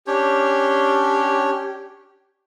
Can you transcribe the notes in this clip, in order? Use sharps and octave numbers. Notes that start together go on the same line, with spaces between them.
C#4 D4 G4 C#5